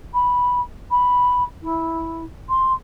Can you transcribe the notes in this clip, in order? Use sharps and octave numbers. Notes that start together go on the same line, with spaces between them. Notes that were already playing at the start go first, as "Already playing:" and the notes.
B5
B5
E4
C6